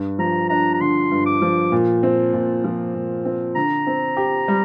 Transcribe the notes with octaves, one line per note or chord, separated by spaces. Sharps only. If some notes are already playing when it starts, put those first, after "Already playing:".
Already playing: G2
F3 A#5
D4 A#5
A#5
D3 C6
G2
D6
F3
A#2
C4
A#2
F3
A#2
C4
D3 A#5
C4
G4
G3